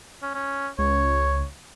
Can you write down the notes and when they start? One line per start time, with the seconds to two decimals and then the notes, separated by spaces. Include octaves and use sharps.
0.22 C#4
0.34 C#4
0.79 C#2 C#5